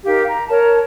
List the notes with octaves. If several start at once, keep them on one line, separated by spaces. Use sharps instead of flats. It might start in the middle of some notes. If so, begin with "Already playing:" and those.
D#4 G4 A#4 F5
A#5
A#4 C#5 A5